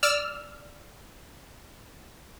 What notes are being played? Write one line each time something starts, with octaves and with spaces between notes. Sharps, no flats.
D5 E6 F6